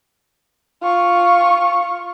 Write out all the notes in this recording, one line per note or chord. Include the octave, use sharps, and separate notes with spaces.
F4 C#6